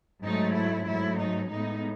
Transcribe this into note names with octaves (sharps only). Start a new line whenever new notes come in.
G#2 F#3 A3 D#4
E4
G#2 F#3 A3 E4
D#4
A2 G#3 B3 D#4